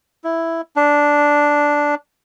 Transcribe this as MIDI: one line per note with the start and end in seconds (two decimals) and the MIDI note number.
0.24 0.61 64
0.76 1.95 62